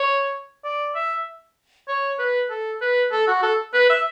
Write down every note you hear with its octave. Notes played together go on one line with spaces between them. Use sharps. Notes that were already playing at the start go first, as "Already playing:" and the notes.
Already playing: C#5
D5
E5
C#5
B4
A4
B4
A4
F#4
A4
B4
E5